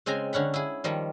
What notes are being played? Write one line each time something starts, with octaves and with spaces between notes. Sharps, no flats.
C#3 G#3 C4 G#5 A#5
D3 C#4 F#5 B5
E4 G#4
D#3 F3 G3